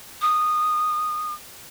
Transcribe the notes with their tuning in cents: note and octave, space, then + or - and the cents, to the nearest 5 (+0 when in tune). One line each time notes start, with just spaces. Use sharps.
D#6 -15